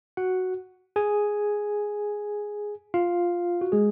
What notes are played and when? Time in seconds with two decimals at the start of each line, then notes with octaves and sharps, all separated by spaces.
0.17 F#4 F#5
0.96 G#4 G#5
2.94 F4 F5
3.61 F#4
3.72 G#3 G#4